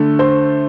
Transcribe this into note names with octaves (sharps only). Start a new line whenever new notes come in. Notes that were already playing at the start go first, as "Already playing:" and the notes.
Already playing: D3 A3
C5